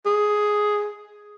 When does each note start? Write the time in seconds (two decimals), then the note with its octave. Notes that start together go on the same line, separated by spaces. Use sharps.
0.06 G#4